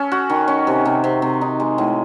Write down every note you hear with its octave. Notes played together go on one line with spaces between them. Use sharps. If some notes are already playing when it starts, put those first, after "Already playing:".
Already playing: C#4 A4
F#4
D#3
C#4
C3
C3
C3
C3
D#4
G#3
A2